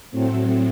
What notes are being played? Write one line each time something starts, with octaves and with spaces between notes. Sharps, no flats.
A2 F#3 A3 C4